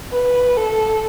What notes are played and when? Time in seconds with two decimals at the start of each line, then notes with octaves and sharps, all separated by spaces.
0.12 B4
0.57 A4